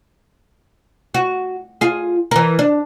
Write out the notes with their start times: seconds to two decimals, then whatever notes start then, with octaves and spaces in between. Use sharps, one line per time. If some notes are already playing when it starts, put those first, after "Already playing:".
1.14 F#4
1.81 F4 G#4
2.31 E3 A#4
2.59 D4